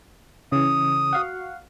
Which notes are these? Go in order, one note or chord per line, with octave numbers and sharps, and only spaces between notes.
C#3 E3 D#6
F#4 F5 F#5